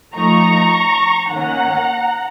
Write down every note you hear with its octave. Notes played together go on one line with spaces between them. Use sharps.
F3 A3 D#4 A#5 C#6
D#3 A#3 C#4 F#5 A#5